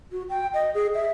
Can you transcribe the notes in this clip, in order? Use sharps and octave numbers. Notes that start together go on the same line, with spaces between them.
F#4
G5
D#5
G#4
E5